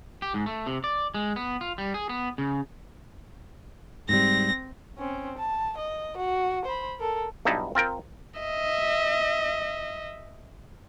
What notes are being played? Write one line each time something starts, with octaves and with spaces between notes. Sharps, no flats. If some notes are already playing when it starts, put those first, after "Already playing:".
G4
G#2
A3
C3
D5
G#3
B3
F4
G3
G#4
B3
C#3
G#2 G3 C4 A#6
C4 C#4
A5
D#5
F#4
C5 B5
A4 A#4
B1 G2 D#4 E4 A5
C4 F4 A#4 G5
D#5 E5